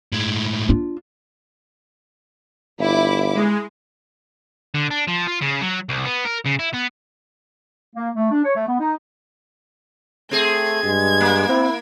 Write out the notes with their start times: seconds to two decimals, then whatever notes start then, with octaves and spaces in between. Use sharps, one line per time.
0.13 A2 G#3
0.69 D4 F4
2.79 G1 E4 D6
3.35 G#3
4.74 D3
4.91 D4
5.07 F3
5.27 F4
5.41 C#3
5.61 F#3
5.89 C2
6.05 B3
6.25 A#4
6.46 C#3
6.59 E4
6.74 B3
7.95 A#3
8.15 A3
8.31 D4
8.44 C#5
8.56 A3
8.67 B3
8.80 D#4
10.31 A3 C4 G#4 G#6
10.84 G2 G#3
11.21 A#3
11.49 C4 E4